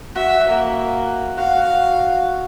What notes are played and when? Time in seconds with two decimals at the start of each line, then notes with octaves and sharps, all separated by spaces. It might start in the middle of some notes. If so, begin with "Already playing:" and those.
0.15 F#4 E5
0.49 A#3
1.38 F#4 F5